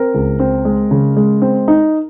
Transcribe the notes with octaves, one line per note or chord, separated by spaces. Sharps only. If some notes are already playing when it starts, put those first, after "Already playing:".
Already playing: C4 A#4
C#2
C4
G#3
C#3
G#3
C4
D#4